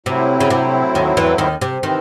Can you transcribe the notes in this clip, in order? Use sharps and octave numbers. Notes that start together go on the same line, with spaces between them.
A2 C3 F#3 C4 E4
C#3
C3
D#2 D#3
E2 E3
D#2 D#3
C3
C3 D#3 E3 C4